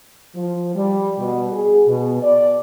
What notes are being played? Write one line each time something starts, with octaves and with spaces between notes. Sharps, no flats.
F3
G3
B2
G#4
B2
D5